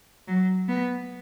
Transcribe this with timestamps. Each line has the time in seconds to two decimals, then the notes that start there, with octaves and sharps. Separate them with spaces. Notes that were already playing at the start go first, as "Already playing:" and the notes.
0.28 F#3
0.68 B3